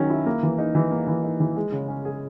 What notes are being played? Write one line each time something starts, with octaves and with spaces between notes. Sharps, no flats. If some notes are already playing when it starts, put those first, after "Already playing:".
Already playing: D#3 F#3 C#4
E4
A#3
E3
D#4
E3
A#3
E3
D#4
E3
G#3
C#3
C#4
G#4